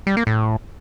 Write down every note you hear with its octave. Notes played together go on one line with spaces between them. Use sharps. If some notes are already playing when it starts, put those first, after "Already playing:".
G3
A#3
A2